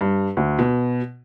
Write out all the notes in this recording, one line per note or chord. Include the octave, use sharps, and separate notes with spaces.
G2
D2
B2